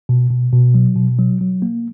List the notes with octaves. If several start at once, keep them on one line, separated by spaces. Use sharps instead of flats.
B2
B2
B2
F#3
B2
F#3
F#3
A#3